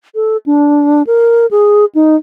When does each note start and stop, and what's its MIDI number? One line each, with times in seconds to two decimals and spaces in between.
0.15 0.37 69
0.46 1.03 62
1.07 1.46 70
1.51 1.85 68
1.95 2.16 63